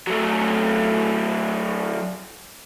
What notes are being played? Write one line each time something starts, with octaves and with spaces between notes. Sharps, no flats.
F#3 A3